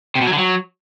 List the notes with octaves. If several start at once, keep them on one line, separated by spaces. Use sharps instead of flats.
C3
B2
F#3
D3
F#3